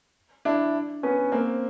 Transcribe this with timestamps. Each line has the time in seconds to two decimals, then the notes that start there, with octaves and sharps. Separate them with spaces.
0.45 D4 E4
1.03 B3 C#4
1.32 A#3 C4